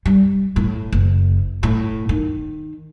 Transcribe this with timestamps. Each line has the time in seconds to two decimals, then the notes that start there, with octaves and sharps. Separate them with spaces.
0.06 G3
0.56 A2
0.92 F#1
1.63 A2
2.09 D#3